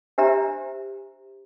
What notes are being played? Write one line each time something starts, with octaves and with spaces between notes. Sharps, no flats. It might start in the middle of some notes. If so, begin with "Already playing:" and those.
D4 G4 C5 E5 A#5